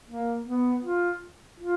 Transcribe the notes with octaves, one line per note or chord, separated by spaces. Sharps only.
A#3
B3
F4
F4